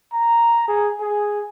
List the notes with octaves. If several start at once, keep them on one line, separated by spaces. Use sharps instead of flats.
A#5
G#4
G#4